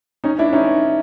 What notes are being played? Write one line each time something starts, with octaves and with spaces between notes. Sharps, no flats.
C#4 D#4
D4 E4
C#4 D#4